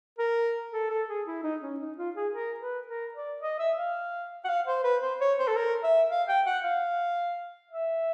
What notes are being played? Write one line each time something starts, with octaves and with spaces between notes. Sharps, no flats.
A#4
A4
A4
G#4
E4
D#4
C#4
D#4
F4
G#4
A#4
B4
A#4
D5
D#5
E5
F5
F#5
F5
C5
B4
C5
C#5
C5
A4
A#4
E5
F5
G5
F#5
F5
E5